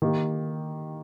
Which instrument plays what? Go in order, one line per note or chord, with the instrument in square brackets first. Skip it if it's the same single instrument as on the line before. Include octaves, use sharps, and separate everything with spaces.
[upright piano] D#3 A#3 G4